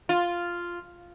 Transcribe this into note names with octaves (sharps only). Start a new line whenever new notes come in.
F4